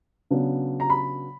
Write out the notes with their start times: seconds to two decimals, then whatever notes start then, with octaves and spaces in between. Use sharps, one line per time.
0.30 C#3 F#3 B3 D4
0.80 A#5
0.90 B5